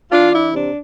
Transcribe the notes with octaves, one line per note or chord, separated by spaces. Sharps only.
E3 D4 F4
D4 E4
C3 D4